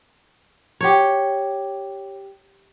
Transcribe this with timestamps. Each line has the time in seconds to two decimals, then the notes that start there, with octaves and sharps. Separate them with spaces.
0.81 G4 C#5